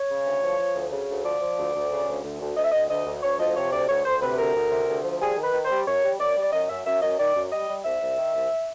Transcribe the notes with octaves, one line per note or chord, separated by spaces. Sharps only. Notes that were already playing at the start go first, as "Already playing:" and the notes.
Already playing: C#5
C#3
D2
F3
F3
D2
C#3
D2
F3 D5
F3
D2
D2
C#3
D2
D2
D2
D2 D#5
E5
D2 D#5
D2 D#5
D2
D2 C#5
F3 D#5
C3 C#5
D2 D5
D2 C#5
D2 C5
C3 B4
D2 A#4
D2
C3
D2
F3
G3 G#4
D#3
B4
D#3
C5
G3
F#2 C#5
G3
F#2 D5
G3
D5
F#2 D#5
F#2 E5
F#2 E5
F#2 D#5
D#3 D5
F#2
G3 D#5
G3
C2 E5
C2
D#3
C2